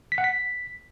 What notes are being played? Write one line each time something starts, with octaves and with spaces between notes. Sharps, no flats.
B6
F#5
B6